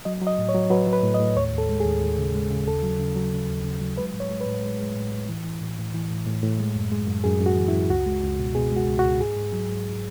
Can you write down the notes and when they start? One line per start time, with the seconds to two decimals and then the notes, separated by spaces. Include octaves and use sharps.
0.05 F#3 D#5
0.21 F#3
0.27 D#5
0.39 A2
0.49 C#5
0.55 F#3
0.70 F#3 B4
0.87 F#3
0.93 B4
1.03 A2
1.14 D#5
1.19 A2
1.36 D#2 C#5
1.52 D#2
1.58 A4
1.69 G#3
1.80 D#2 G#4
2.02 D#2
2.18 C#3
2.35 G#3
2.50 C#3
2.68 D#2 A4
2.83 F#3
2.99 C#3
3.16 F#3
3.33 C#3
3.49 D#2
3.65 C#3
3.81 F#3
3.98 G#3 B4
4.13 A2
4.20 C#5
4.31 G#3
4.41 B4
4.46 A2
4.62 G#3
4.80 G#3
4.95 A2
5.12 A2
5.29 E3
5.45 E3
5.61 A2
5.78 A2
5.94 E3
6.11 A2
6.27 A2
6.42 A2
6.60 G#3
6.76 F#2
6.92 G#3
7.07 F#2
7.24 F#2 G#4
7.41 F#2
7.46 F#4
7.57 E3
7.68 E4
7.73 F#2
7.90 C#2 F#4
8.06 G#3
8.23 C#2
8.39 B2
8.55 B2 G#4
8.72 G#3 F#4
8.88 C#2
8.99 F#4
9.04 C#2
9.21 G#2 G#4
9.36 G#2
9.53 F#3
9.69 G#2